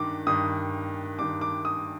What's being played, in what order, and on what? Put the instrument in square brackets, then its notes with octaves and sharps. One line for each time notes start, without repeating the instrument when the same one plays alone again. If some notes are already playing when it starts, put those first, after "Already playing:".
Already playing: [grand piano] G2 D#3 D6
G2 D#3 D#6
G2 D#3 D6
D6
D#6